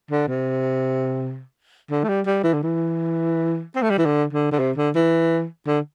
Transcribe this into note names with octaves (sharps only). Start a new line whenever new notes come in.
D3
C3
D3
A3
G3
G3
E3
D3
E3
C4
A3
G3
E3
D3
D3
D3
C3
D3
E3
D3